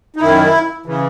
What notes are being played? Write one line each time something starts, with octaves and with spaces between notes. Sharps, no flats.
D#4
F#2 D#3 E4
C#3 E3